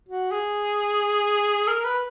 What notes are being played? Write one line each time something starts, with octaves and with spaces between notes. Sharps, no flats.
F#4
G#4
A#4
B4